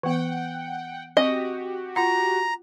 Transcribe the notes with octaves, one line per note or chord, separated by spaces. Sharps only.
E3 B3 F#5 G5
C4 F#4 G4 D#5
F4 F#5 A#5